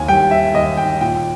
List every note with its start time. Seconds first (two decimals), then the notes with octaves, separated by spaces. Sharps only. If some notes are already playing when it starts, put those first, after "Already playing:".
Already playing: D#2 G#5
0.08 G3 G5
0.31 E5
0.54 D#2 D#5
0.77 G5
1.01 A#2 G5